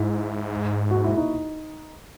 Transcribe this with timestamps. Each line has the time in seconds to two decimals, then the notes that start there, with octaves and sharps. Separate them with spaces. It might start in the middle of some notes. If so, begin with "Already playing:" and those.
Already playing: G#2 E4
0.91 F#4
1.04 E4
1.17 D#4